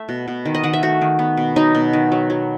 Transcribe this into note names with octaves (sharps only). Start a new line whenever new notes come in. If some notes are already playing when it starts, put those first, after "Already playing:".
Already playing: A3 E5
B2
B2
D#3
D#5
D#3 F#5
E5
A3 F#4
D#3
B3
B2
F#3 D#4
B2
D#3
F#3
F#3